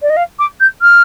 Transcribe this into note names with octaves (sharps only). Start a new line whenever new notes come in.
D5
D#5
F5
D6
G6
F6